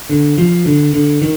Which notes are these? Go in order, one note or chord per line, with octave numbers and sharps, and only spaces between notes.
D3
F3
D3
D3
D#3